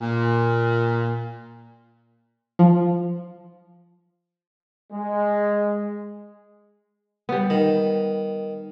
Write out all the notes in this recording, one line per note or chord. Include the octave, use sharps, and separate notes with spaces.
A#2
F3
G#3
G3 B3
D#3